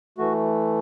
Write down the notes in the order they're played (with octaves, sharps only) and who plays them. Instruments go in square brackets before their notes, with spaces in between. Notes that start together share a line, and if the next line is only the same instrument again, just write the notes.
[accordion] E3 A3 F#4